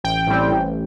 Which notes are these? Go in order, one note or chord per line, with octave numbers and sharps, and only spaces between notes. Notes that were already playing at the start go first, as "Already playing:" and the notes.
A1 G5
A2 G3 C4
A1